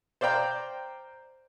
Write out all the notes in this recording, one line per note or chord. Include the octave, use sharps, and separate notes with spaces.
C5 D5 F5 G5 A#5